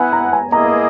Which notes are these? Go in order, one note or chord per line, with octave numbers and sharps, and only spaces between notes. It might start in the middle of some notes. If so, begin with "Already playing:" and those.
Already playing: B3 E4 B4 F#5 G#5
A#5
G#5
A#3 E4 G#4 D#5 A#5